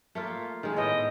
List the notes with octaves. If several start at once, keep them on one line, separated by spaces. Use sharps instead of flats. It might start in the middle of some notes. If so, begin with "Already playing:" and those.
A3 A#3 F4
D#3 G#3
A2 B3 D#5 G5